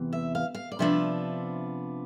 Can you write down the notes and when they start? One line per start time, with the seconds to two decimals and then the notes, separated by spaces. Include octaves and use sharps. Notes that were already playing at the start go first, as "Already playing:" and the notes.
Already playing: E2 C3 E3
0.13 E5
0.35 F5
0.55 F5
0.72 D5
0.79 C3 F3 B3 D4 E5